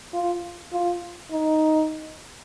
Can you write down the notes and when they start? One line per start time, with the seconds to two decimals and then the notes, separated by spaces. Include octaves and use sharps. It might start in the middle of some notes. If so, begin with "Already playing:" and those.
0.14 F4
0.73 F4
1.31 D#4